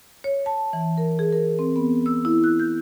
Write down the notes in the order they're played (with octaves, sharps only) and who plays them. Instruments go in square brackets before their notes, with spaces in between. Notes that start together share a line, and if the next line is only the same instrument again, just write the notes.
[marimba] C#5
A5
E3
A#4
G#4
A#4
C4
B3
E6
E4
F#6
G6